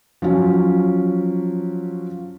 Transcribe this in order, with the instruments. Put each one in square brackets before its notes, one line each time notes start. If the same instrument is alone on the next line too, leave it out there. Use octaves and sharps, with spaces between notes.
[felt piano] F3 F#3 C#4